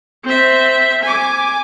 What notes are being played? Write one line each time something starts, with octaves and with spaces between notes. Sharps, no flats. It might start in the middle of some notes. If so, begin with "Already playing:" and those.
C4 E5
G#5 D6